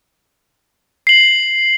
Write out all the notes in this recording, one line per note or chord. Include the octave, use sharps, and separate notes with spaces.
C7 F#7